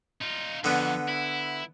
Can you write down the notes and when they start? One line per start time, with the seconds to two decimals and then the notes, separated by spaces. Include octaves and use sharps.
0.22 D#4 F4
0.64 F2 D3 B3
1.09 E4